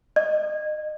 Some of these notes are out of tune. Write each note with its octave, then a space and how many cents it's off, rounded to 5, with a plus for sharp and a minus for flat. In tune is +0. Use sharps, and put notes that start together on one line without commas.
D#5 -30